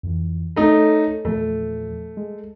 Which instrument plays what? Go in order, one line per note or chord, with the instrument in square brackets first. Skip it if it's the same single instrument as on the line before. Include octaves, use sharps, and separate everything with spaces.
[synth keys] F2 E3
[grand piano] A3 D#4 [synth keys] A4 C#5
[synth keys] E2 A#2 F3 [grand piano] A3
[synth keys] G#3